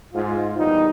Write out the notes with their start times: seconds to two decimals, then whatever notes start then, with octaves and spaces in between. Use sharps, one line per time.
0.13 G#2 F4
0.57 E2 A#2 G3 D#4